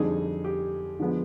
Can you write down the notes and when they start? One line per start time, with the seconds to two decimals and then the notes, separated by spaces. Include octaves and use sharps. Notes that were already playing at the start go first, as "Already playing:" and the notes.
Already playing: F2 D3 G3 C4 D#4 G#4
0.45 G4
1.00 D3 F3 G#3 B3